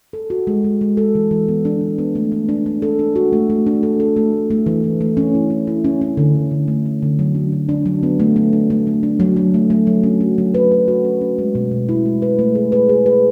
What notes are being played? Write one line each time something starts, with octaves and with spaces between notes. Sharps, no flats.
A4
F#4
G#3
G#3
G#3
A4
E3
E3
B3
D4
E3
B3
A3
A3
D4
D4
A4
D4
F#4
A3
A3
D4
A4
A4
A3
A3
A3
E3
A3
A3
C#4
E4
C#4
E4
C#4
C#4
D3
D3
D3
A3
A3
D3
F#3
D4
F#3
D4
F#3
B3
A3
A3
D4
A3
A3
D4
F#3
F#3
A3
A3
F#3
C#4
F#4
F#3
B4
B4
F#4
C#4
C#4
G#3
B2
B2
E4
G#3
B4
A3
G#4
B4
G#4
B4